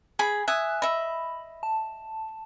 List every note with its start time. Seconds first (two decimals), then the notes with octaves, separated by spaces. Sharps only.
0.19 G#4 B5
0.48 E5 G#5 D#6 F#6
0.82 D#5 E5 B5
1.63 A5